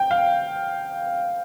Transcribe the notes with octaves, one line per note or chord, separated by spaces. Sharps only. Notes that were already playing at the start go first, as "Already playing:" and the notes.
Already playing: G5
F5